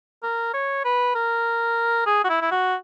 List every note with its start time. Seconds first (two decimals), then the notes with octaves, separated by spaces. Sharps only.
0.23 A#4
0.54 C#5
0.85 B4
1.15 A#4
2.07 G#4
2.24 F#4
2.29 E4
2.42 E4
2.51 F#4